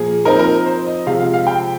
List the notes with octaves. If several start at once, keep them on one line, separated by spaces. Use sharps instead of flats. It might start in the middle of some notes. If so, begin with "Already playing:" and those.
Already playing: A#2 F3 A#3 G#4
F3 C4 D#4 A#4
A#4
C5
D#5
C3 F3 G#3 F5
F5
F5
G5